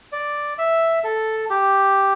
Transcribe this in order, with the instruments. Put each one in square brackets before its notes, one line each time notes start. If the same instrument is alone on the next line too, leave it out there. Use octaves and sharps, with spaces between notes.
[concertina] D5
E5
A4
G4